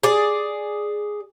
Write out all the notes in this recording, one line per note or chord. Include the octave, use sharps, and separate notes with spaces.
G#4 D5